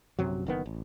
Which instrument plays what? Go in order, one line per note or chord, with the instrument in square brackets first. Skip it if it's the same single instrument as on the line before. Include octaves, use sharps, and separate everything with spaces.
[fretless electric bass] A#1 F#2 C3 F#3
F#1 D#3 B3
A1